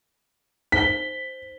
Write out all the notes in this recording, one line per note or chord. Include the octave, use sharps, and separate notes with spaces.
D#4 C5 B6 G7